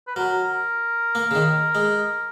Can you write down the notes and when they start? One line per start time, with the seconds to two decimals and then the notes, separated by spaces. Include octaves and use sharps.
0.07 B4
0.16 F#3 A#4
1.15 A#3
1.31 C#3
1.35 D#3
1.75 G#3